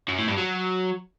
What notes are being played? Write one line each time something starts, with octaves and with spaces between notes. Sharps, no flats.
F#2
A2
G2
F#3